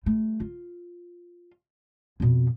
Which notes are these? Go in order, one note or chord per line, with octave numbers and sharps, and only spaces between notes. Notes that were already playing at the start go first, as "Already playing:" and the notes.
G3 A3
F4
F2 B2